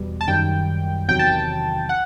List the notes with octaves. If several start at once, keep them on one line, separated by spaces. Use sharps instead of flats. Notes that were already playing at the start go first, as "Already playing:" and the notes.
Already playing: E2 B2 G3
A5
F#2 D#3 G3 G5
E2 C3 D#3 F#3 G5
A5
G5
F#5